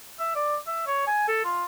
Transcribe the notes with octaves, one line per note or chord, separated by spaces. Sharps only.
E5
D5
E5
C#5
G#5
A4
F4